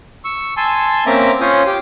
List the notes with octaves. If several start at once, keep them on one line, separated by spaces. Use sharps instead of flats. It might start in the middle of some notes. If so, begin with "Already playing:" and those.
C#6 E6
G#5 A5 C6 E6
A#3 C4 C#4 E5 A#5 D6
C#4 F4 C5 C#5 D#6
G4 G5